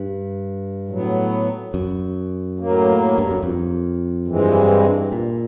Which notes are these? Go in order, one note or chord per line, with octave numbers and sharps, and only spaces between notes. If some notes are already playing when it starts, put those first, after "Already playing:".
Already playing: G2
A2 F#3 B3
F#2
A2 F#3 A#3
G2
F#2
F2
G2 E3 G#3 C4
A#2